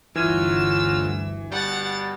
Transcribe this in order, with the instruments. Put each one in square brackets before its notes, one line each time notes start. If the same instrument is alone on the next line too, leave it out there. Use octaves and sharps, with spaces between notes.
[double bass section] G1 D2 [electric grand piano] E3 G#6 D#7 [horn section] F#3 F4 [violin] E6
[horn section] B2 G3 [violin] F#5 A6